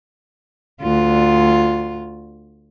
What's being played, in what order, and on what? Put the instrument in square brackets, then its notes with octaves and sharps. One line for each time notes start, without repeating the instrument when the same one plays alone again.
[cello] D2 F4